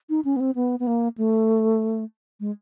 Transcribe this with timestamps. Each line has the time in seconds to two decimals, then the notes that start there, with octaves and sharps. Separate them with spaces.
0.09 D#4
0.25 C#4
0.36 B3
0.40 C4
0.55 B3
0.79 B3
0.87 A#3
1.18 A3
2.40 G#3